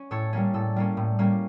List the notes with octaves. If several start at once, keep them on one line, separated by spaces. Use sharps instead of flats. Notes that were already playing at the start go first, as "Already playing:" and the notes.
Already playing: C#4
A2 A4 C#5
G3 A#3 C#4
A2 A4
G3 A#3 C#4
A2
G3 A#3 C#4